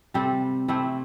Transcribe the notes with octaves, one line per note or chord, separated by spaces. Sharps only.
C3 G3 C4 A4
C3 A3 C4 E4